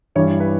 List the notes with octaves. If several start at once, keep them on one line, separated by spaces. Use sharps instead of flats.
G2 E3 G3 C#5
B4